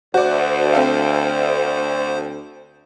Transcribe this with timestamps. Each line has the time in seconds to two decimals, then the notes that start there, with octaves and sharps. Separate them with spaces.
0.14 D2 F#4 C5 D5
0.73 C4 A4 F5